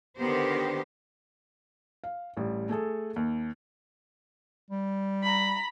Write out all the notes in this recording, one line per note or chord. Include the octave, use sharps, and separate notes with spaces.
D3 D#3 B3 G4 A#4 C5
F5
A1 G3
A3 G#4 A4
D#2
G3
A#5 B5